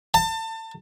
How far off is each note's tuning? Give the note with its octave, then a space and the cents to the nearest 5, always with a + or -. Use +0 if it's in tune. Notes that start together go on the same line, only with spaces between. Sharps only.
A5 +30